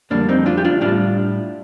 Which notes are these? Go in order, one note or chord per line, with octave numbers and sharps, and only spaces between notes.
F2 D3 G3 A#3 D4
C4 D#4
D4 F4
G4
D4 F4
A2 G3 D4 F4